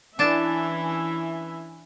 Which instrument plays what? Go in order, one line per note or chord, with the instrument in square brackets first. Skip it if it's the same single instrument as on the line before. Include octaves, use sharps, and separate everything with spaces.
[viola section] E3 C#4 E5 [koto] D4 A5